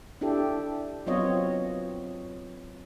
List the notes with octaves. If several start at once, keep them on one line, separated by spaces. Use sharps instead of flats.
D4 E4 G4 A4
F#3 B3 C4 F4 C#5 D#5